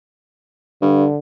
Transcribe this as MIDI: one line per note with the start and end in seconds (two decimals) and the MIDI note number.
0.82 1.06 43
0.82 1.18 50